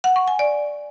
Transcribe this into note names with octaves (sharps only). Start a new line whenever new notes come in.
F#5
C#6
G#5
D5